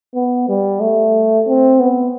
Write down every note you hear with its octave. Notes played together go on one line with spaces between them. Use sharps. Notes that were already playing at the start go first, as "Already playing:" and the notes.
B3
G3
A3
C4
B3